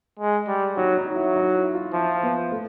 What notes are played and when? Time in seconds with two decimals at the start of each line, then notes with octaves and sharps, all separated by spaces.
0.19 G#3
0.48 G3
0.77 F#3 D#4
0.97 D#4
1.06 F#3
1.16 E4
1.36 D#4
1.55 E4
1.74 F4
1.93 F3 E4
2.23 B3
2.52 A3